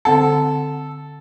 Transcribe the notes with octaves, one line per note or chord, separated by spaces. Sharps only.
D3 C4 A4 F#5